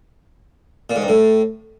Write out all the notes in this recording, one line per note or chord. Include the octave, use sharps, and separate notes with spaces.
A#2
G#2
G2
A2